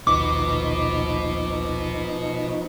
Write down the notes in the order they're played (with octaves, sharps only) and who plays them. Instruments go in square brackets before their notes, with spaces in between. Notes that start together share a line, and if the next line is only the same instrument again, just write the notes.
[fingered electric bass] A#1 D#2 [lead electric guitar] B2 B3 [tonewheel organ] F3 D#4 [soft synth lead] D6